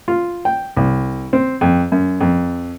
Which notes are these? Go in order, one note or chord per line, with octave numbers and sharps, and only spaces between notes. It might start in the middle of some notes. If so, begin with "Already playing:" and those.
F4
G5
C2
C4
F2
F#2
F2